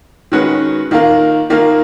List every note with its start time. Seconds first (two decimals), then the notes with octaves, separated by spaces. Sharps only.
0.32 D#3 G#3 C#4 F#4 B4
0.91 D#3 A#3 F4 A#4
1.50 D#3 A#3 F4 A#4